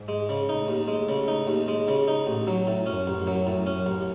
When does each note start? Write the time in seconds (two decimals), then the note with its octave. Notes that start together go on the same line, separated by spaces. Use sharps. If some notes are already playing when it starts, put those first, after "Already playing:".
Already playing: G#2
0.08 G#3
0.29 C#3
0.48 A2 D#4
0.68 D#2
0.88 G#3
1.09 C#3
1.28 D#4
1.47 D#2
1.68 G#3
1.88 C#3
2.08 D#4
2.27 A1 A2
2.47 F#3
2.67 A2
2.86 F#2 C#4
3.07 A1
3.17 F#2
3.27 F#3
3.47 F#2 A2
3.66 C#4
3.76 F#2
3.86 A1